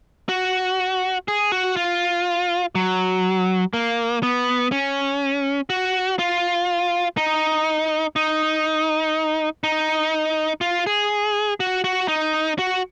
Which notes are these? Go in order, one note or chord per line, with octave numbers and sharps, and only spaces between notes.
F#4
G#4
F#4
F4
F#3
A#3
B3
C#4
F#4
F4
D#4
D#4
D#4
F4
G#4
F#4
F#4
D#4
F#4